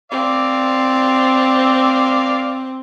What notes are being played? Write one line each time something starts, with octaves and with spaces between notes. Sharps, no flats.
C4 D5 F5